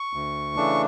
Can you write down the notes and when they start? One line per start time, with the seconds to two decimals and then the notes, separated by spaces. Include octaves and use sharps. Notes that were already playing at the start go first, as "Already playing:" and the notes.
Already playing: C#6
0.13 D2
0.56 C#3 E3 A3 D4